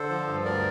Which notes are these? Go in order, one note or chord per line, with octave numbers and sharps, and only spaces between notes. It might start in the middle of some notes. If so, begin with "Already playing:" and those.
Already playing: D3 A4 C5
F3
G2
D2 A#4 D5